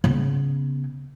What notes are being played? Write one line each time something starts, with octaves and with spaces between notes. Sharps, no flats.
C#3 B3